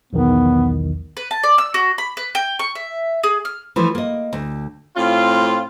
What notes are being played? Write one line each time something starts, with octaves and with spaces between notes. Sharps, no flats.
B1 E2 D#3 B3
B4
A5
D5
E6
F#4
B5
B4
G5
C#6
E5
G#4
F6
E3 F3 A3
A#3 D#5
D2
A2 C4 F4